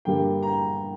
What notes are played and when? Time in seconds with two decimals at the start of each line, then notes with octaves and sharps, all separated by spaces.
0.05 G2 D3 G3 A#3 G5
0.43 A#5
0.47 G5